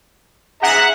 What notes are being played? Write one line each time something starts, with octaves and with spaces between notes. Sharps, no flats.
G#4 E5 F#5 A#5